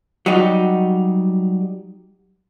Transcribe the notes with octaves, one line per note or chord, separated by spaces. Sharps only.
F#3 G3 D#4 F#4 G4